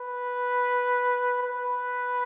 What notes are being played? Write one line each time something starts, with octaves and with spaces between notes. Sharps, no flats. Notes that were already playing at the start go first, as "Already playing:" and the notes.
Already playing: B4
B4